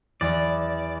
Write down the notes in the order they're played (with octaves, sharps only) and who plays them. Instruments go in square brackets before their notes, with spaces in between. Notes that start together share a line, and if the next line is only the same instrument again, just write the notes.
[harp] E2 [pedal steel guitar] D5